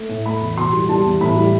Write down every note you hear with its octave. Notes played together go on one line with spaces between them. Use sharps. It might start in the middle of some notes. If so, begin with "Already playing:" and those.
Already playing: A3
A2
A3 B5
E2
B2 C6
G3
G3 A5
E2
A2 B5
G3